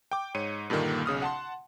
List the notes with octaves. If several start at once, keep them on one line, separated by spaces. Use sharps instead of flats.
G5 D6
G#2 C#5 C#7 D#7
G2 A#2 D3 D#3 A#3
B1 C#3 D#6 F6
F#5 A5 C6